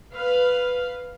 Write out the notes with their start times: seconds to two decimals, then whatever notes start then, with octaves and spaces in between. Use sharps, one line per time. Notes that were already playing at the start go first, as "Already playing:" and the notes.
0.13 B4 F5